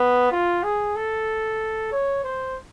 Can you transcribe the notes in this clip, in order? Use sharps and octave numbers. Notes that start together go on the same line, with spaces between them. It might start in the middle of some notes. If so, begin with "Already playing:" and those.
Already playing: B3
F4
G#4
A4
C#5
C5